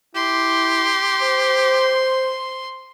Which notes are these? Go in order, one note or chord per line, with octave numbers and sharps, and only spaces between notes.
E4 G4 C6
C5